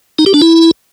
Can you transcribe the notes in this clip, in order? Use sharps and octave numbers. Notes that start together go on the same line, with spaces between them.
D#4
G4
D4
E4